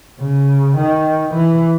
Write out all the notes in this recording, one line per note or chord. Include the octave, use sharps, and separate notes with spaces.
C#3
D#3
E3